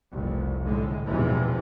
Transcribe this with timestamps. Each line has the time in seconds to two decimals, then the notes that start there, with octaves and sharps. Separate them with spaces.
0.13 F1 C2
0.65 A2 D3 G#3
1.06 B1 E2 C3 E3 F3 G#3